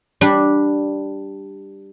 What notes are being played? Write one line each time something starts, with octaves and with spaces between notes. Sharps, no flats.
G3 D4 G4